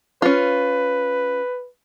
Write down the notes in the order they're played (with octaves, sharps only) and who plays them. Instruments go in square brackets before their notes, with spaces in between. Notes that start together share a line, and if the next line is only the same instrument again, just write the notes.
[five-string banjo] C#4 F4 [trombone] B4